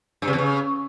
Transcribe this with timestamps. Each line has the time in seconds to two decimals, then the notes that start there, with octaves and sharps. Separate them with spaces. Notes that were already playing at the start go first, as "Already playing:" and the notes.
0.22 G2
0.28 C#3
0.33 E2
0.38 C#3